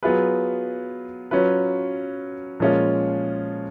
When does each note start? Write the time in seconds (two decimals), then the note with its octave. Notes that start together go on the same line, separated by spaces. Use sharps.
0.03 F#3 B3 F4 G#4 B4
1.31 F#3 C#4 F4 B4
2.60 A#2 F3 G#3 C#4 F4